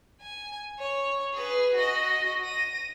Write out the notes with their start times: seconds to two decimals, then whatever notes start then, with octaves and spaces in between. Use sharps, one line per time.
0.21 G#5
0.79 C#5
1.33 G#4 B4
1.75 F#4 D#5
2.43 A#6 D#7